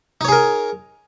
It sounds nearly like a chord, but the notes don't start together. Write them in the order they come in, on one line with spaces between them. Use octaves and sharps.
D#4 C#5 G#4 A#4